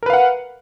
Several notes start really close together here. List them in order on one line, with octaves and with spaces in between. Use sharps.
A#4 B4 F5 F#5